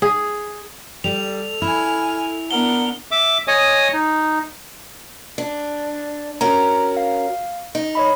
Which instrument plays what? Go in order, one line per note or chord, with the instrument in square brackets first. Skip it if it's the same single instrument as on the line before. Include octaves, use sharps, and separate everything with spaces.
[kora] G#4
[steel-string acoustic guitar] G3 [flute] A4 [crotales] F7
[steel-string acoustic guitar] E4 [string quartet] G#5 F6
[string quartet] B3 D4 A#4 [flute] F#5 [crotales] G7
[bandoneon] E5 D6
C#5 D#5 G#5 D#6
D#4
[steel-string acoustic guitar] D4
[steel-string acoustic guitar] C#4 F#4 A#4 [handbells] A#5
[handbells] F5
[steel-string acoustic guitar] D#4
[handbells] C#5 D#5 B5